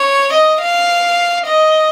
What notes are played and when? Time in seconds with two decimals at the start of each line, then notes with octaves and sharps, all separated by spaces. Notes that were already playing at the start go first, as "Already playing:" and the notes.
Already playing: C#5
0.32 D#5
0.62 F5
1.46 D#5